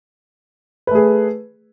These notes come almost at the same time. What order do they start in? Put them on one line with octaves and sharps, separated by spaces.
B4 A3 G#4